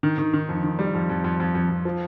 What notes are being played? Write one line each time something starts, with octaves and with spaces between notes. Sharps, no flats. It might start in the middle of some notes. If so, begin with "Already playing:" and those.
D#3
D#3
D#3
F2
D#3
G3
F2
F2
F2
F2
F2
F2
F3